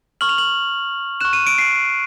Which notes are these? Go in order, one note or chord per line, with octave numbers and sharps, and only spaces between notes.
C#6 F6 F#7
F7
F#7
C#6 F#6 E7
D#7
D7
C7